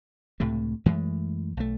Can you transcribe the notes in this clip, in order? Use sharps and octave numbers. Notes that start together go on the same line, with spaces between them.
C#2 A2 C3 A3
F#2 E3 G#3 A3
B1 A3